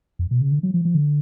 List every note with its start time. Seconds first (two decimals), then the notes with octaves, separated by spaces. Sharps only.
0.19 F2
0.31 B2
0.41 C#3
0.51 D3
0.63 F#3
0.74 F3
0.85 F3
0.95 D3